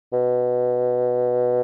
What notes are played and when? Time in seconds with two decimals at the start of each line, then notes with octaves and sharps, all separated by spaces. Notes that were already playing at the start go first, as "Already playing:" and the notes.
0.12 B2